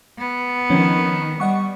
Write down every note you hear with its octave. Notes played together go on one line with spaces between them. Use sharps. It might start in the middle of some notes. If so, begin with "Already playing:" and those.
B3
D#3 F3 C4 C#4
G3 D#5 F#5 C#6